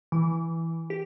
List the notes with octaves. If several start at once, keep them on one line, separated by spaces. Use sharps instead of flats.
E3
G4